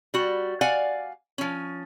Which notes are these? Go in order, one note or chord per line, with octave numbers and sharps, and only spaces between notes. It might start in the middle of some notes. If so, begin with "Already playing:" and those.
G3 F#4
D5 F5 F#5 G#5
F3 C#4